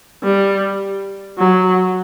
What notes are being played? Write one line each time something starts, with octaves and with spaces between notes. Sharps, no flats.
G3
F#3